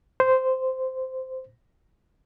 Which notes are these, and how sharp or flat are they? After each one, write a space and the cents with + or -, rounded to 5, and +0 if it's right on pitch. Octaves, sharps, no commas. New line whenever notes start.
C5 -10